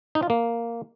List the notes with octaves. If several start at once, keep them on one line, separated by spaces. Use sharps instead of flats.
D#4
F4
A#3